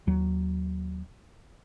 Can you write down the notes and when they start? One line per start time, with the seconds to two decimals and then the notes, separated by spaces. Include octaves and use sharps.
0.07 D#2 F#3